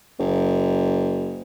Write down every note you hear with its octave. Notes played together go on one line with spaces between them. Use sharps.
F#1